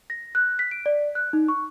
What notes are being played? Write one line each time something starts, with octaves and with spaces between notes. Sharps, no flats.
A#6
F#6
B6
D7
D5
F#6
D#4
C#6